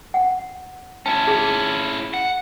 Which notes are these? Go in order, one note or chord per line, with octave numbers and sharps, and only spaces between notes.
F#5
C#4 E4 A5
G#4 A5
F#5